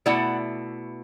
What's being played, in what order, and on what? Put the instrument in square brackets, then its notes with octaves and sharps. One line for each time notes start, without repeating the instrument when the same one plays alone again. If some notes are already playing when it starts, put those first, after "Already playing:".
[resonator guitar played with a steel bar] B2 A3 E4 D5 F#5